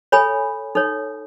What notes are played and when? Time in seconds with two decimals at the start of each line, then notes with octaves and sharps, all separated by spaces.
0.12 A4 C#5 G#5 B5
0.75 D#4 A4 C#5